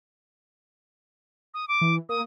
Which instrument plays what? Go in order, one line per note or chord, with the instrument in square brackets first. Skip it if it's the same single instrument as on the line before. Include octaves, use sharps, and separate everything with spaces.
[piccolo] D#6
D6
[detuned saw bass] E3
[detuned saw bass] A#3 [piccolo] D#6